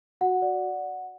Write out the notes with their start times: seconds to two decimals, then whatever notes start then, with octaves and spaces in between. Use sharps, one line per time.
0.21 F#4 F#5
0.42 D5